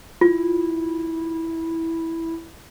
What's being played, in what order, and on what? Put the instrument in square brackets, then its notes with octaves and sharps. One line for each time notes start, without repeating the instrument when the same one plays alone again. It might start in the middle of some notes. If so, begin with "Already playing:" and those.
[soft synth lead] E4 [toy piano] F4